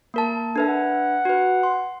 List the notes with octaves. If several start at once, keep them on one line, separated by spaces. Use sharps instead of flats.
A#3 A#4 A5
D4 A4 B4 E5
F#5
F#4 B4
C6